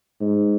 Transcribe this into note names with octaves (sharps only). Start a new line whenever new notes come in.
G#2